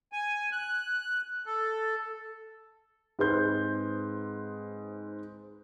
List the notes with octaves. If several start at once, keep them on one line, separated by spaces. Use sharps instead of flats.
G#5
F#6
A4
G#2 G#3 C4 B4 C6 G6